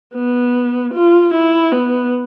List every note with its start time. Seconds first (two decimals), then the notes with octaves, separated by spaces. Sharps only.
0.14 B3
0.94 F4
1.34 E4
1.72 B3